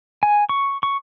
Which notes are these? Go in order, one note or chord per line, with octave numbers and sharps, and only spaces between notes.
G#5
C#6
C#6